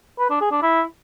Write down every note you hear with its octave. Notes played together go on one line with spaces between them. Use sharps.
B4
D4
G#4
D4
E4